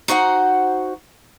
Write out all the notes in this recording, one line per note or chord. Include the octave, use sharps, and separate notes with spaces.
D#4 F#4 C5 F#5